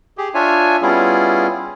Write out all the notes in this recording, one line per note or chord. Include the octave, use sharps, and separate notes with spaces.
G4 G#4
D4 F4 C#5 E5 G#5
G3 B3 C#4 E4 F4 G#4